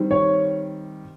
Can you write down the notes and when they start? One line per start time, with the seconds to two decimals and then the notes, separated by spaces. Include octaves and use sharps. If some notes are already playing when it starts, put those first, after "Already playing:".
Already playing: D#3 G3 C4
0.11 C#5